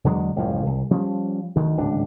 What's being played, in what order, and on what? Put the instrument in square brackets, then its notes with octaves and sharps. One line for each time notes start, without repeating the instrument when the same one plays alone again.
[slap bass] E2 D3 F#3 G#3
F#1 C#2 A2 F3
C2
F3 G3 C#4
D2 D#3
D1 G#1 C#2 D4